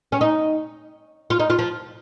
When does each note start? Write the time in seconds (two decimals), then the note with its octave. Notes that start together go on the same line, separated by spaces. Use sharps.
0.12 C#4
0.21 D#4
1.30 F4
1.39 D#4
1.50 F4
1.59 F3